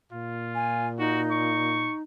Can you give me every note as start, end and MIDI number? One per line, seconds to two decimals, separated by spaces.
0.12 1.92 46
0.12 0.91 65
0.55 0.87 80
0.98 2.02 63
0.98 1.21 66
1.30 1.95 85